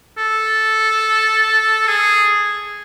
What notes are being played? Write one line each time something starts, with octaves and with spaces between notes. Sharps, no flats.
A4
G#4